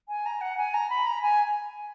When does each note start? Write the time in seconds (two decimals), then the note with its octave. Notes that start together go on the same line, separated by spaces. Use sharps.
0.09 G#5
0.26 A#5
0.41 F#5
0.57 G#5
0.74 A#5
0.90 B5
1.06 A#5
1.22 G#5